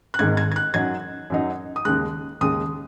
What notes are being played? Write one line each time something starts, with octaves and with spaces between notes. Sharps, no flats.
F#6
G#1 G#2 D#3 G#6
G#6
G#6
F#6
F#2 F#3 D#4 G#6
F#2 F#3 D#4
D#6
D#2 C#3 G#3 F#6
D#2 C#3 G#3 D#6